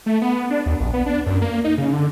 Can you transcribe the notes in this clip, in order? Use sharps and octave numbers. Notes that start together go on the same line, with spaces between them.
A3
B3
D4
D#2
A#1
B3
D4
F#2
A#3
D#4
C#3
D3